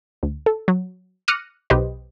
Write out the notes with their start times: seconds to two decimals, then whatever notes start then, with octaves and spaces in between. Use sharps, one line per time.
0.23 D2
0.46 A4
0.68 F#3
1.28 D6 F6 F#6 A#6 C#7 D#7
1.70 B1 G4 B4 C5 D#5